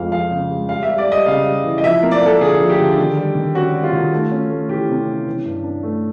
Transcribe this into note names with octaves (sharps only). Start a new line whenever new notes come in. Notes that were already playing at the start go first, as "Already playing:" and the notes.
Already playing: F2 F3 G#3 F5
F3 F5
C#3
G#3
G3 F5
E5
G3
D5
G3
D#5
C#3 F5
G3
E3
D#5
F3 E5
A#3
D5
A#3 A4
D3 G#4
F3
G4
D3
D#3
G3
D#3
C#4 F#4
G3
F4
D#3
A3
C#4
A3
E3 G4
C3
C#4
E3
G2
D4
A3